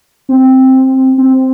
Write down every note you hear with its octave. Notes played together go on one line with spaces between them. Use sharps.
C4
C4